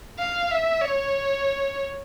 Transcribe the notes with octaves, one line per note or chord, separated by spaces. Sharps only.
F5
E5
C#5